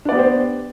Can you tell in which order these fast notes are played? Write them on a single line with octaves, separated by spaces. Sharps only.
D4 D5 B3 G4 C5